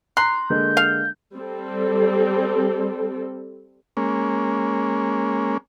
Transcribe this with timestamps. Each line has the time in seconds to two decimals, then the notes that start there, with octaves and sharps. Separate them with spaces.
0.17 A#5 C6 F#6
0.50 D3 G#3 A#3 G6
0.77 F5
1.35 G3 C4 A4
3.97 G#3 A#3 C#4